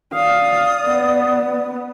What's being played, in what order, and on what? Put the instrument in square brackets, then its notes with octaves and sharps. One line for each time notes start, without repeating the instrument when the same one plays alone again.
[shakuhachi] D5 [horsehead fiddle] F5 [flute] D#6
[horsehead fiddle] B3